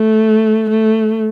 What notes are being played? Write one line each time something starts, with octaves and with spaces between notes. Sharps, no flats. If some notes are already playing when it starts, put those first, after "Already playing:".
Already playing: A3
A3